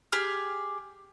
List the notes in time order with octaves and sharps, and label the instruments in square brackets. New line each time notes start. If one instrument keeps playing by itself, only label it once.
[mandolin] G4 G#4 F6